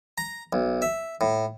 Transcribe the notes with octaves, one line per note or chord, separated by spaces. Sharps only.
A#5
B1
E5
A2